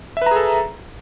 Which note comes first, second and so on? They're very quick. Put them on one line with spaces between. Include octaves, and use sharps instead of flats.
E5 B4 A#5 G#4 A4